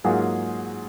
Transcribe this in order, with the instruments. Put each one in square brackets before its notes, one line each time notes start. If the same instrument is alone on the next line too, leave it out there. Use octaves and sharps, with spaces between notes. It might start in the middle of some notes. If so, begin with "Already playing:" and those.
[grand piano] G#2 F#3 A#3 F4 G#4